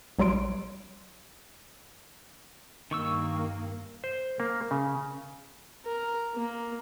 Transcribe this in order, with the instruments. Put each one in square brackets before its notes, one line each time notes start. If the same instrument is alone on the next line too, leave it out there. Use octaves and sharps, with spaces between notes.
[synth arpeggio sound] A#1 F#3 G3 C6 D7
[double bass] G2 A#3 [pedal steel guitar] D#3 C#6 E6
[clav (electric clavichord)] C5
A#3
C#3
[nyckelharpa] A#4
A#3